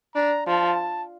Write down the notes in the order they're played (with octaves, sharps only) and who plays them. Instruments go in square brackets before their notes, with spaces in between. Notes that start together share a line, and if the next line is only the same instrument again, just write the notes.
[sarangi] D4 [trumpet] A#5
[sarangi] F3 [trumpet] A5